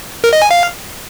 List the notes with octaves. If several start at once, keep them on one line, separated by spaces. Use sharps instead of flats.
A#4
D#5
G#5
F5